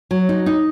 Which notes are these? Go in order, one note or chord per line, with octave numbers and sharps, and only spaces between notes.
F#3
D#4
D#4